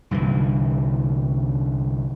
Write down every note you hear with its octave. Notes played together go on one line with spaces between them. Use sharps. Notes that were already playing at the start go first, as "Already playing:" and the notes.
C2 G2 D3 E3